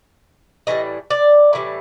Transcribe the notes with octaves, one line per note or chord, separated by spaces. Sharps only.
A2 E3 G3 D#5
D5
A2 E3 G3